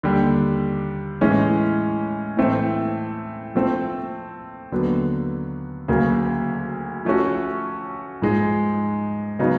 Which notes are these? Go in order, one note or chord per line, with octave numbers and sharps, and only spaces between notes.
D#2 D3 G3
A2 E3 G#3 C#4
A2 E3 A3 C4
F3 A3 C4
D#2 D3 F#3 B3
D2 C#3 F#3 A#3
F3 A3 C#4 F#4
G#2 F3 G#3
C#3 F#3 B3 D#4